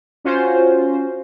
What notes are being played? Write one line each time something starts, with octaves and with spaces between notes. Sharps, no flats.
C#4 F4 F#4 C5